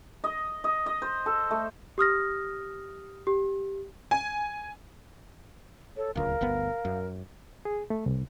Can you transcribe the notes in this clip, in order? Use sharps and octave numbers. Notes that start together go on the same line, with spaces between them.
D#5
D#5
D#5
C5
A4
A3
G4 D#6 F6 A#6
G4
G#5
A4 C#5
D1 C#2 A#4 F5
G1 D2 B3
F#2
G#4
A3
C2